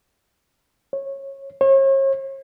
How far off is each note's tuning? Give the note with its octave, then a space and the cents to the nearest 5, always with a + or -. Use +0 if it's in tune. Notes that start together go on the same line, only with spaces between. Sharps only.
C#5 -20
C#5 -40